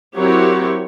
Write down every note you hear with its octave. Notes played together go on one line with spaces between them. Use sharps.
F#3 C4 E4 G4 A#4 C#5